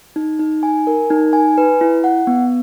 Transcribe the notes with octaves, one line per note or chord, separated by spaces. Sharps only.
D#4
D#4
G#5
A#4
D#4
G#5
B4
E4
F#5
B3